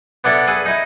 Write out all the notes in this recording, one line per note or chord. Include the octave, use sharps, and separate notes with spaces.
B3 D4 E4 A4
G#4 A4 B4
D#4 E4